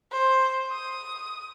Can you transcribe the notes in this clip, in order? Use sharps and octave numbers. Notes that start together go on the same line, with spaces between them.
C5
D#6